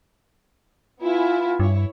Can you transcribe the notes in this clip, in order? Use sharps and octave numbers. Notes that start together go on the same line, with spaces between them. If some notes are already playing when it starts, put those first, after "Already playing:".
B3 E4 F4 G#5
G2 E4 C#5